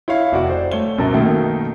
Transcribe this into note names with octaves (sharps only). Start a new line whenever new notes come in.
E4 C#5 F5
F1 F#4 D5
C5
A3 C#5 G7
C2 F#2 B2 A#4 A5
B2 D#3 A3 A#3